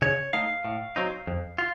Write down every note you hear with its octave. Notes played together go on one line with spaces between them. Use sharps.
C#3 C#5
A3 D#4 F5
A2
F#3 C4 D#4
F2
F4